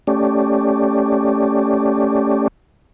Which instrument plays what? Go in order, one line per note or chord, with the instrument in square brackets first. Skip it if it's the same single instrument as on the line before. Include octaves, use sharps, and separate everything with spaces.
[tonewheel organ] A3 C#4 G4 D5